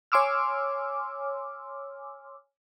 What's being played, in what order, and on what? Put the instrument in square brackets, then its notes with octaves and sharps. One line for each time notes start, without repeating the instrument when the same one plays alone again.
[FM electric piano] C#5 G#5 C6 D6 E6 F6